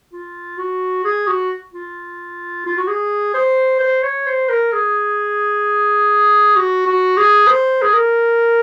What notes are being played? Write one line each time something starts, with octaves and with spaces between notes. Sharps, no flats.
F4
F#4
G#4
F#4
F4
F4
F#4
G#4
C5
C5
C#5
C5
A#4
G#4
F#4
F#4
G#4
C5
G#4
A#4